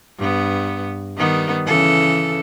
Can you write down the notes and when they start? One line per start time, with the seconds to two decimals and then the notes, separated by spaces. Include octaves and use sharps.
0.19 G2 B3
1.17 D#3 G3 B3
1.66 C#3 E3 A4